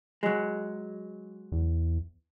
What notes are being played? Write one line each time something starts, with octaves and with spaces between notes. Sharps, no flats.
F#3 G#3
E2